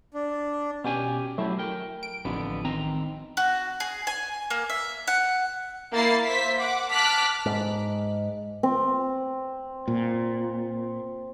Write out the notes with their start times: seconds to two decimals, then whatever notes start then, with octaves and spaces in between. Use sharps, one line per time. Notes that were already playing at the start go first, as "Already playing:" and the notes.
0.14 D4
0.84 B2 C#4 G4 G#5
1.38 F#3 A3 E4 G4
1.59 A#4 G5
2.03 D7
2.25 A1 F2 D3 B3
2.64 D#3 C4 A#5
3.37 F#4
3.80 G#4
4.07 G#5
4.50 A#3
4.70 E5
5.07 F#5
5.92 A#3 E4 A6 C7
6.25 C5 E5 B6
6.59 F#5 D6
6.90 A5 D6 F6 F#6 B6
7.46 G#2
8.63 C4
9.88 A#2